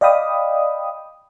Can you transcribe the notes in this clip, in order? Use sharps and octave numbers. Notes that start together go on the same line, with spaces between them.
D5 D#5 F5 G5 B5 D#6